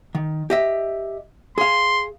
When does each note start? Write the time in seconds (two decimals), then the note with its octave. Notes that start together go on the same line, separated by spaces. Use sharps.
0.15 D#3
0.50 G4 D#5 E5
1.58 G#4 F5 C6